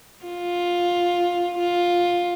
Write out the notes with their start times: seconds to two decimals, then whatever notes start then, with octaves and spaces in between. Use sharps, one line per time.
0.25 F4
1.59 F4